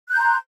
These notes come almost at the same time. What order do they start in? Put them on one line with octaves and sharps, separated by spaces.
F#6 G6 A#5 C6